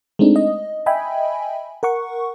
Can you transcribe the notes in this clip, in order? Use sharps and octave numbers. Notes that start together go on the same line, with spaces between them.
G#3 A3 C4 D4 D#4
D#5
D#5 E5 G5 G#5 B5
A#4 F#5 C#6